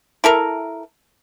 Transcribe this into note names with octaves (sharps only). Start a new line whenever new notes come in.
E4 A4 A#4